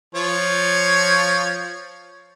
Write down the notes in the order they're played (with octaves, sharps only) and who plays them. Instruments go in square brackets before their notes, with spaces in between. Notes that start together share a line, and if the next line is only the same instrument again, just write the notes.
[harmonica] F3 C#5